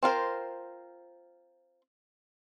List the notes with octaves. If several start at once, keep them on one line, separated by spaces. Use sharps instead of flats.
C4 F4 A#4 C5